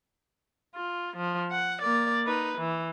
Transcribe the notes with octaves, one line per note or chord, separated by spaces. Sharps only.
F4
F3
F#5
A#3 D5
D#4 B4
E3